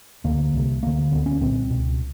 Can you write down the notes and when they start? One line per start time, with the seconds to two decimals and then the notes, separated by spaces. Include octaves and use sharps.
0.24 D2 D3 A#3
0.53 C2 C3
0.83 D2 D3 A#3
1.11 D2 D3 B3
1.26 C#4
1.41 C2 A#2 C4
1.70 C#2 B2